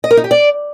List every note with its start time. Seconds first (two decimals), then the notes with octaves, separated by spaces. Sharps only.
0.04 D#5
0.11 A#4
0.17 D#4
0.24 G4
0.31 D5